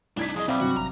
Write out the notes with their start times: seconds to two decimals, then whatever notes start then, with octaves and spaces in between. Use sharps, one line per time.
0.17 C2 D4 D#4 G#6 B6
0.36 F3 G#4 D#5
0.48 B1 G3 C4 D5 E5 F5
0.60 G2 C3 F#3 F#4
0.77 G#1 A#5